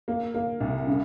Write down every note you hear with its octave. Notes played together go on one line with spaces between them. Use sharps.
A#3
A#3
C2
C#3